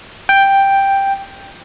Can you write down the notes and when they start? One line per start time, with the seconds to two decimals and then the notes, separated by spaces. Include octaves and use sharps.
0.29 G5